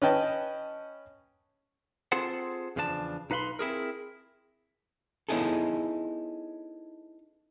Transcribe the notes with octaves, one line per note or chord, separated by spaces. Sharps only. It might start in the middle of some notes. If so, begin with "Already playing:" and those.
C#4 B4 D#5 G5 A5
C4 F4 G#4 A4 C5 F#5
E2 C#3 F3 D4 A5
B1 D#4 B4 F5 B5 C6
C4 E4 G#4 A#4
B3 C#4 D#4 E4 G#4 A4